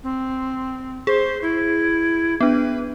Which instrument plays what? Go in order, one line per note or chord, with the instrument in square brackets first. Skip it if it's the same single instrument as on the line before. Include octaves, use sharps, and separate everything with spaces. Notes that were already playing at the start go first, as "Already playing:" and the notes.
[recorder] C4
[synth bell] G#4 [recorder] C5
[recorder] E4
[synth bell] B3 D4 [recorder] B4